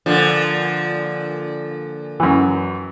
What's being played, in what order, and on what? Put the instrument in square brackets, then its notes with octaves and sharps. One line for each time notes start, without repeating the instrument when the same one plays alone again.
[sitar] A#2 D3 F3
[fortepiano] F#2 E3